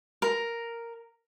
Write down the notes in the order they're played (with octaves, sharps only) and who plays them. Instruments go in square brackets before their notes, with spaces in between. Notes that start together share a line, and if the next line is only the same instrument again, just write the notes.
[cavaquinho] A#4